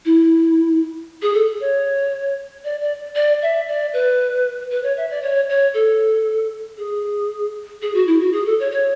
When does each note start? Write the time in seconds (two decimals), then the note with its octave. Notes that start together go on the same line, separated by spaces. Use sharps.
0.05 E4
1.22 G#4
1.34 A4
1.61 C#5
2.64 D5
2.81 D5
3.15 D5
3.42 E5
3.68 D5
3.93 B4
4.71 B4
4.83 C#5
4.97 E5
5.10 D5
5.22 C#5
5.49 C#5
5.74 A4
6.77 G#4
7.82 G#4
7.94 F#4
8.07 E4
8.21 F#4
8.33 G#4
8.46 A4
8.60 C#5
8.71 C#5